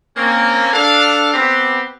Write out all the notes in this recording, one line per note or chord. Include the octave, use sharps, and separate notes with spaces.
A#3 C4 C#4
D4 A4 F5
B3 C4 G4